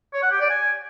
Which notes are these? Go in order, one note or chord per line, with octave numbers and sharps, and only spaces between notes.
C#5
F#5
G4
D5
G#5